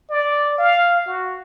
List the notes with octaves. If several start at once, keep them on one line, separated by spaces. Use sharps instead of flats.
D5
F5
F#4